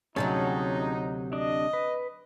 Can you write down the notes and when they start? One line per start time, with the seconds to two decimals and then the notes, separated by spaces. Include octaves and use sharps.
0.16 D2 C3 F#3 C#4 D#4 G#4 A5
1.33 D4 D#5
1.73 B4